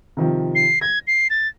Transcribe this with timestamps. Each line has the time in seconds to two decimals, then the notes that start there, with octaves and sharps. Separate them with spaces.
0.17 C3 D#3 F3
0.55 C7
0.81 G#6 A#6
1.07 C7
1.30 A6